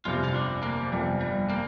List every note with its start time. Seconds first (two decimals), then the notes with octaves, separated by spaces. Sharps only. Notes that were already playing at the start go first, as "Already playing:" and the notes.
0.05 G1 F2 C3 F4
0.24 F4
0.34 D4
0.63 A#3
0.81 F3
0.92 G1 F2 C3 G3
1.21 G3
1.49 A#3